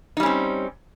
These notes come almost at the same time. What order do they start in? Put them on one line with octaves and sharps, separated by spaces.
D#4 G3 C#4 C4